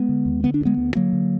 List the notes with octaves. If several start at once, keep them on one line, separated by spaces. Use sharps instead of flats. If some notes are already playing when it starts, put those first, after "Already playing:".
Already playing: G#3 B3
D3
D#2
D3 B3
D4
D2
G#3 B3
D2
D3 F#3 A#3
D3